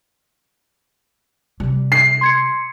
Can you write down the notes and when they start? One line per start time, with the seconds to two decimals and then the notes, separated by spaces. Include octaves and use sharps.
1.60 C3 G3
1.92 C7
2.21 C6 G#6 C#7